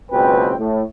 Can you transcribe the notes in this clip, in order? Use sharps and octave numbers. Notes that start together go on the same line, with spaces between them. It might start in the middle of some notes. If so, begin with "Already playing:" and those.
F#1 C#2 B2 C4 B4 G5
A2